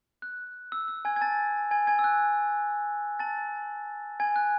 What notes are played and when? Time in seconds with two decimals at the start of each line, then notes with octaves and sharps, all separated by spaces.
0.22 F#6
0.72 E6
0.88 E6
1.05 G#5 G#6
1.16 G#6
1.21 A5 A6
1.71 G#5 G#6
1.87 G#5 G#6
1.99 E6
2.04 F#6
3.19 A5 A6
4.20 G#5 G#6
4.36 F#6